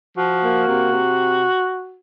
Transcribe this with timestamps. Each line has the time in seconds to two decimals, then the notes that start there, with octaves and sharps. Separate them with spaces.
0.17 F3 F#4
0.43 A#3
0.68 C3
0.92 C3